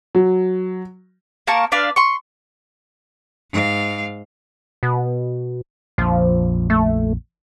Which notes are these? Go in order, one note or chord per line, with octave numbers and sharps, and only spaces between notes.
F#3
A#3 A#4 A5 C#6
D4 B4 D5 F5
C6 C#6
G#2 F5
B2
A#1 F2 F3
A3